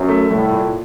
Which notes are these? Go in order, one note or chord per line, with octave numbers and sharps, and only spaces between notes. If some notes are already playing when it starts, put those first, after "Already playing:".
Already playing: F#2
A3
C2 A2
A#2